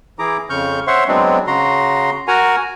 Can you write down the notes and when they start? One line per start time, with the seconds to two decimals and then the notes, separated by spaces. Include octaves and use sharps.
0.19 E3 E4 G#4 A#5 D6
0.50 F2 C#3 C#6 F6 G6
0.87 C5 C#5 E5 F#5 C6 C#6
1.08 F#3 G#3 B3 C4 D4
1.47 C#3 F#4 A#5 C6
2.28 F#4 A#4 F#5 G#5 A#5